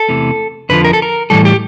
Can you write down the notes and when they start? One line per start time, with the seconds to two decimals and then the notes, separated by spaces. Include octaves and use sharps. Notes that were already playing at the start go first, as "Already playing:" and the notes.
Already playing: A4
0.08 E2 C3 E3 A3
0.69 F2 D3 F3 B4
0.85 A#4
0.93 A4
1.02 A#4
1.30 A2 E3 G3 A4
1.45 G4